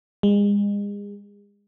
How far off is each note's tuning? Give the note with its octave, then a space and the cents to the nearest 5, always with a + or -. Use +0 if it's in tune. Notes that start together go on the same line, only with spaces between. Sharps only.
G#3 -35